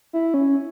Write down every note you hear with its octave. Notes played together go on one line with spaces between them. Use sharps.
E4
C#4